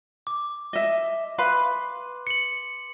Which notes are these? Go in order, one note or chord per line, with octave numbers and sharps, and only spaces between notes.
D6
D#5 E5
B4 F5 B5 C6
C#7 F#7